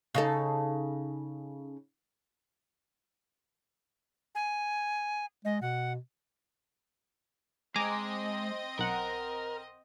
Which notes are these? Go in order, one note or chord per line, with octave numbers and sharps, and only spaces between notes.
C#3 D#4 A4
G#5
G#3 D#5
B2 F#5
G#3 C4 D#5 G#5 A#5 D6
B1 A#4 F#5